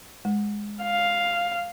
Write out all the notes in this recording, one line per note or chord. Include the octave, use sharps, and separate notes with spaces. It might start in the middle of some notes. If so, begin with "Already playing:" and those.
G#3
F5